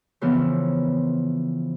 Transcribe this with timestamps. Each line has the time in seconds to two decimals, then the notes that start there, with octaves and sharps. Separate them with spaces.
0.21 C#3 E3 F3 B3 C4